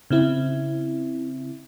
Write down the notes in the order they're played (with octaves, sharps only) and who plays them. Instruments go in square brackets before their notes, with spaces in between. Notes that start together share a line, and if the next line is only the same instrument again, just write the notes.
[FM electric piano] C#3 C4 E4